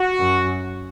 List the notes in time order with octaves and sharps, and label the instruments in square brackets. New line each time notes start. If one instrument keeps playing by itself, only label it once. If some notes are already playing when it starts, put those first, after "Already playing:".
Already playing: [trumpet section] F#4
[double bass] F#2